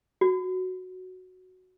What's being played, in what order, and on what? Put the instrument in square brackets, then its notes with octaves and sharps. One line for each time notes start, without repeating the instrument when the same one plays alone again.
[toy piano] F#4